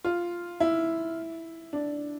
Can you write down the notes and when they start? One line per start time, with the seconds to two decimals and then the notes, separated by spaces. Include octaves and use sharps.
0.04 F4
0.60 E4
1.73 D4